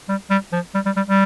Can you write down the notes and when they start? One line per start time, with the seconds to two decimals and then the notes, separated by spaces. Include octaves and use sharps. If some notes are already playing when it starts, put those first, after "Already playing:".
0.09 G3
0.30 G3
0.52 F3
0.74 G3
0.86 G3
0.96 G3
1.08 G3